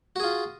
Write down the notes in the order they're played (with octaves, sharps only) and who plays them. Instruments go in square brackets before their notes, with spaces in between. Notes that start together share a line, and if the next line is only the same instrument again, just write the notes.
[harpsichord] F#4
G#4
F4